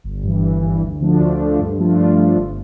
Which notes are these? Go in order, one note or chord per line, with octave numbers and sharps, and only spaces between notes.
G1
G2 E3
G1
G2 E3
D2
D3 F3 A3 D4
D2
D3 F3 A3 D4
G2
F3 A3 D4 F4
G2
F3 A3 D4 F4
G1